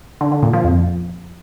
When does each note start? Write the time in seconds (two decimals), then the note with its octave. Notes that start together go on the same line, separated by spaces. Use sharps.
0.21 D3
0.32 D3
0.43 A#2
0.53 F3
0.64 F2